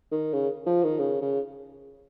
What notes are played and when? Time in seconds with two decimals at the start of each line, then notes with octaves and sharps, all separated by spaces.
0.12 D#3
0.33 C#3
0.66 F3
0.83 D#3
1.00 C#3
1.22 C#3